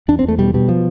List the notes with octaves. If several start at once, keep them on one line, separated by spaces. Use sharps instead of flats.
E2 D4
C4
E2 A3
B2 G3
B2 G3
F3